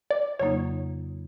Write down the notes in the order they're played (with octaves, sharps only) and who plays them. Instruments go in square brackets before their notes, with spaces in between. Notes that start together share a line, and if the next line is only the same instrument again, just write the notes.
[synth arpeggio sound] D5
[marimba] F2 C#3 F#3 A#3 D#4 [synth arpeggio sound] C#5